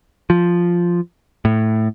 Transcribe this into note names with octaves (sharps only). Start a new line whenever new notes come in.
F3
A2